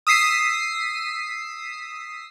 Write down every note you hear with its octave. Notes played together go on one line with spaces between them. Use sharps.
D#6 E6 B6 C7 D#7